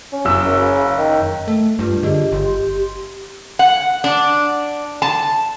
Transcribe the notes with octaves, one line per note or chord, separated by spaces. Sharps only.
C#4
F#1 E6
F#2
C#3
D#3
A3
G2 D4 F4 B4
D3 G4 G#4 D#5
G1 G4 C6
F#5
D4
A5